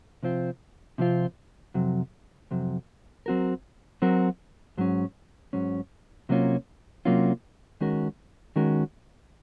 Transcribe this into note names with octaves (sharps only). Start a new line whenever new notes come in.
C3 F3 C4 F4
C3 F3 C4 F4
F2 C3 F#3
F2 C3 F#3
F#3 C4 F#4 A#4
F#3 C4 F#4 A#4
G#2 F#3 C#4
G#2 F#3 C#4
C3 F#3 A#3 C#4 F4
C3 F#3 A#3 C#4 F4
D#3 G#3 C#4 F#4 A#4
D#3 G#3 C#4 F#4 A#4